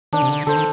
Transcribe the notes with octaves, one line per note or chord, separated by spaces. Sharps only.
D#3 D4
C3
D3
D3 A4 C5
D#3